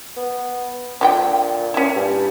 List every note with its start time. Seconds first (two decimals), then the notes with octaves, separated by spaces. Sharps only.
0.17 B3
1.01 A#2 D3 G4 G5
1.74 C#4 E4
1.96 G2